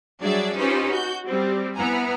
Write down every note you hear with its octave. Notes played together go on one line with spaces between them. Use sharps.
F#3 G3 D4 G#4 D5 E5
C#4 D#4 F4 G4 B4 C5
F#4 G6
G3 C4
B3 E4 G#5 A#5